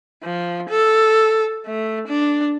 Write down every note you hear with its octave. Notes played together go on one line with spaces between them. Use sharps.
F3
A4
A3
D4